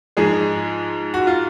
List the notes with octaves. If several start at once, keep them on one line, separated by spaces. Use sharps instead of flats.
G#2 F3 G#3 G#4
F#4
F4